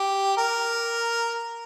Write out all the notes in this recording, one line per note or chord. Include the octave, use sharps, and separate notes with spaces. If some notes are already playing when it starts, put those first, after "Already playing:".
Already playing: G4
A#4